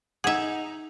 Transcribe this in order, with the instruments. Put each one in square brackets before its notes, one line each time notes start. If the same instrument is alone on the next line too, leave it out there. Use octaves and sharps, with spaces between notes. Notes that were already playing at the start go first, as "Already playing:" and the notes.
[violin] D#4 [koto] G#4 E5 [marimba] F#5